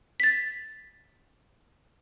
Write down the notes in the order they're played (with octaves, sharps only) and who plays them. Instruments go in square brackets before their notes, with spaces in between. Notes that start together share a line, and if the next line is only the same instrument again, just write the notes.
[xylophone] A6 B6